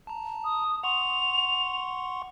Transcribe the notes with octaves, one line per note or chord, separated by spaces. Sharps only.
A5 A#5
D#6
F#5 C6 C#6 F7